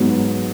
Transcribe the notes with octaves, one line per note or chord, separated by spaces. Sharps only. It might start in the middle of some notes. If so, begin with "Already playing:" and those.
Already playing: G#2 F#3 B3